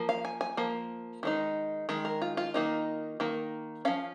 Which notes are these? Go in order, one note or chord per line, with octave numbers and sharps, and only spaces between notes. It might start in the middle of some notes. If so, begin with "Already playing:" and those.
Already playing: F3 A#3
F5
G#5
G#5
F3 A#3
D#3 G#3 D#4
D#3 G#3
A#4
F4
F4
D#3 A#3 D#4
D#3 A#3
F3 C#4 F5